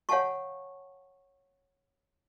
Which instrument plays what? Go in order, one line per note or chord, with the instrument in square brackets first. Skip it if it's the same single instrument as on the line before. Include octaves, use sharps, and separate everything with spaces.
[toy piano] C#5 F5 F#5 G#5 A5 C#6